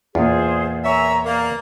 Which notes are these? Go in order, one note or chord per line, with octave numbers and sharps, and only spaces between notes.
E2 A#2 F4 G#4 C5
A#4 C#5 E5 G#5 A#5
A#3 D5 A#5